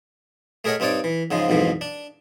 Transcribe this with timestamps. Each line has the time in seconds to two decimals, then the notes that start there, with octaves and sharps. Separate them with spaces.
0.64 A3 G#4 A#4 C#5 D#5 F#5
0.80 G2 C4 D#4 C#5 D5
1.04 E3
1.31 G#2 C#3 F3 G#3
1.48 B1 F2 G#2 E3 F3
1.81 D4